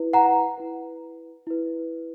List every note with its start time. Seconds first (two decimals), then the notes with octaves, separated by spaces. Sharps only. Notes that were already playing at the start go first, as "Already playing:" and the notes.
Already playing: E4 B4
0.13 F#5 A#5
0.58 E4 B4
1.47 E4 B4